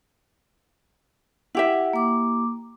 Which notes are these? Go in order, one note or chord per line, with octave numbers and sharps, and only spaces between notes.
E4 G4 E5 F#5
A#3 D6